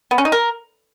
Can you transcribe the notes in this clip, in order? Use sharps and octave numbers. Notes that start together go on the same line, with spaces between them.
B3
C#4
D#4
A#4